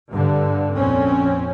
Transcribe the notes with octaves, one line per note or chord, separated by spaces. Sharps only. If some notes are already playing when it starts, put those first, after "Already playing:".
G2 D3
A#1 F2 C4 C#4